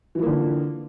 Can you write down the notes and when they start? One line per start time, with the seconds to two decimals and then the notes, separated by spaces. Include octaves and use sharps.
0.15 E3
0.19 F3
0.23 A#3
0.27 D3